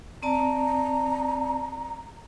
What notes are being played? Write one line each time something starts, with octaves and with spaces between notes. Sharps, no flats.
C4 D5 A5 A#5